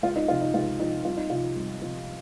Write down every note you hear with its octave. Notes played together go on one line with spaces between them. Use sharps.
C#2 F4
D#4
C3 F3 F4
D#4
C#2 F4
C3 F3 D#4
C2 F4
D#4
C3 F3 F4
C2
C3 F3